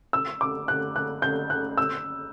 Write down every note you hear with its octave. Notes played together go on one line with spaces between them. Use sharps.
E6
D6
F#6
F#6
G6
F#6
E6